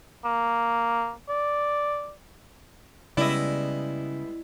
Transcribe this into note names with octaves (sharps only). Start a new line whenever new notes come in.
A#3
D5
C#3 G3 G#3 B3 E4 D5 D#5